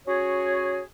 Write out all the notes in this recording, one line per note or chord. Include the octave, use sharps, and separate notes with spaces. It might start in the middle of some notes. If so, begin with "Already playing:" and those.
C#4 F#4 G#4 C#5